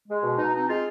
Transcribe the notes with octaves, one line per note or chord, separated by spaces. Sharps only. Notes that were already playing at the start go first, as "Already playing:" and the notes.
G#3
B2
B2 D#4
C4 D#4
G#3 F4